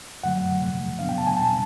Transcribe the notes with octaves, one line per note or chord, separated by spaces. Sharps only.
F#2 D3 F#3 A3 F#5
E2 C3 F3 A3
C#3 F#3 B3 D4 F5
G5
A5
G#5
E2 B2 G3 C4 A5